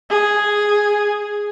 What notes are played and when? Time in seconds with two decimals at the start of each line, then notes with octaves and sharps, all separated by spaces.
0.10 G#4